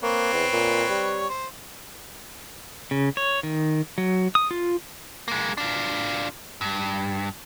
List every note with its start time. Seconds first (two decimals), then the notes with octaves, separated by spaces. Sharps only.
0.03 A#3 C4 B4 C#5
0.33 E2
0.53 A#2
0.90 G3
1.29 C5
2.91 C#3
3.17 C#5
3.43 D#3
3.98 F#3
4.35 D#6
4.51 F4
5.28 G#3 A#3
5.58 D4 F4
6.61 G2